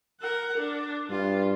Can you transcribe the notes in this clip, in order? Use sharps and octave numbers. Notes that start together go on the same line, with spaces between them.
A#4 F#5
D4
G2 F4